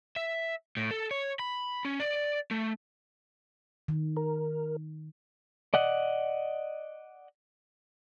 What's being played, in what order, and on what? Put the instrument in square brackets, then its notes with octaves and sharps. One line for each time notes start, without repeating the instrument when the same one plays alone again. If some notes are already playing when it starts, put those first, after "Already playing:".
[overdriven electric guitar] E5
A2
A4
C#5
B5
C#4
D5
A3
[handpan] D#3
[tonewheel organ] A#4
[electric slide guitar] D5 D#5 F#5